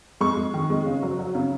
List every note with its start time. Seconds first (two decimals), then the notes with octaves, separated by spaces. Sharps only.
0.21 G#3 C#6
0.37 G#3
0.54 D#3
0.70 G#3
0.86 C#3
1.02 F#3
1.19 F#3
1.35 C#3